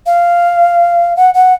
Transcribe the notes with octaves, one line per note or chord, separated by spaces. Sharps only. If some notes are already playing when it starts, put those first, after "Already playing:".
F5
F#5
F#5